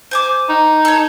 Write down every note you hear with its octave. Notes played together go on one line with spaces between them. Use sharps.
C5 G#5 D6
D#4
A4 C#5